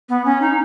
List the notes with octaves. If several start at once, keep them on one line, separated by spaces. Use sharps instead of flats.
B3
C#4
D#4